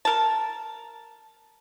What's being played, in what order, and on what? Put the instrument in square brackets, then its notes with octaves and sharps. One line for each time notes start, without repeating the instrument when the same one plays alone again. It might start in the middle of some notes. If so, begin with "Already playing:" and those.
[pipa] A#4 A5